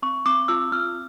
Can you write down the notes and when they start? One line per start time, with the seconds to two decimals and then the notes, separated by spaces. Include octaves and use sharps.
0.02 C4 C#6
0.26 C4 D6
0.48 F4 E6
0.72 C4 F6